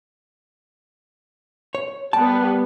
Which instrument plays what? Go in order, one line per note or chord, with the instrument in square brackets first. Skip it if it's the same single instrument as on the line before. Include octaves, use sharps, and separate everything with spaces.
[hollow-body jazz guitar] C#5
[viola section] G3 B3 [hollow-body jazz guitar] G5 A5